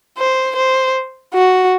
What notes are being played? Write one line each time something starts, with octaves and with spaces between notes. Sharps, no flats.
C5
C5
F#4